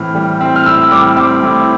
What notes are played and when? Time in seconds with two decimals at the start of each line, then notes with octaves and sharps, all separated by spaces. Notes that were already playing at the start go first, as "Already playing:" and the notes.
Already playing: A2 E3 C4 F6
0.15 G3
0.41 C4
0.56 F6
0.65 A2 E6
0.91 G3 D6
1.17 C4 D6
1.43 A2